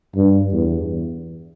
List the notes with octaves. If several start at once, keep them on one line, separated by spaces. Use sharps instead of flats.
G2
E2